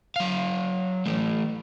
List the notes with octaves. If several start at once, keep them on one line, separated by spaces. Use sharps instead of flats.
F#3 F5
E3 A3